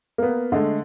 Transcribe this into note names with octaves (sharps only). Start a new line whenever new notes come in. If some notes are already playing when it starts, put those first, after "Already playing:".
A#3 B3
D3 G#3 A3